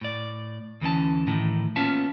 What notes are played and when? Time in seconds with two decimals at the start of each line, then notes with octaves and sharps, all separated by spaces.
0.01 A2 D5
0.81 D2 E3 C#4 A5
1.27 A2 D#3 E3
1.76 A#3 B3 C#4 F4 E5 A5